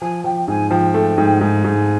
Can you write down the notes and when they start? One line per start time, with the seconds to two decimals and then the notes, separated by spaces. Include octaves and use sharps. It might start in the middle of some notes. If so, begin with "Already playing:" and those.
0.01 F3 G#5
0.24 F3 G5
0.48 G#2 G#5
0.70 F3 G5
0.94 A3
1.18 G#2
1.41 G#2 G#5
1.64 G#2